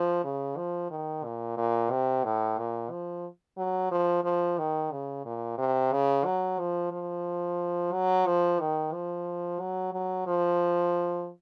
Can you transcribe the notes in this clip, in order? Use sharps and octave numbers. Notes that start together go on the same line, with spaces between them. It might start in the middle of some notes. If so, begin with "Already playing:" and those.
Already playing: F3
C#3
F3
D#3
A#2
A#2
C3
A2
A#2
F3
F#3
F3
F3
D#3
C#3
A#2
C3
C#3
F#3
F3
F3
F#3
F3
D#3
F3
F#3
F#3
F3